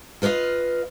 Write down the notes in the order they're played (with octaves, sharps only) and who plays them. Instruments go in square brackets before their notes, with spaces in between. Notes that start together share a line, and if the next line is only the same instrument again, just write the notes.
[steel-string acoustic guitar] F4 B4 C#5 D#5 F5